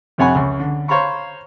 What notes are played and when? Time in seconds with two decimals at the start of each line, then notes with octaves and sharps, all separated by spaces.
0.18 F2 C3 C#5 F#5 G#5 B5
0.35 C#2
0.59 D3
0.88 C5 C#5 F5 A#5 B5 C#6